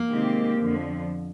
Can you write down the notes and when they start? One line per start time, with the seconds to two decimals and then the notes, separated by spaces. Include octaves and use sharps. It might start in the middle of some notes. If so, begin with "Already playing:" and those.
Already playing: A#3
0.09 C3 D#3 G#3 C4 G4
0.59 F2 D3 F3